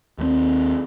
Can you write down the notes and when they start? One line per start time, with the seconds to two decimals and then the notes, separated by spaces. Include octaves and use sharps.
0.18 D#2 A3 C4